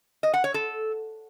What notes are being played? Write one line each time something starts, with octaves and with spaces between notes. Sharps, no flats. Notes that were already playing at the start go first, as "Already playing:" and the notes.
D#5
F#5
C#5
A4